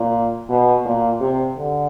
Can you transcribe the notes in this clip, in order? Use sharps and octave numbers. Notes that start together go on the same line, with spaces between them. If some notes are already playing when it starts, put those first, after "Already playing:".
Already playing: A#2
B2
A#2
C3
D3